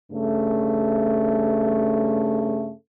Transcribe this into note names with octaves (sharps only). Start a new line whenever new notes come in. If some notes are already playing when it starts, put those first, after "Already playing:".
G2 C#3 A3